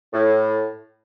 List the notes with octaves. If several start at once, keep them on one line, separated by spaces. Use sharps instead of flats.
A2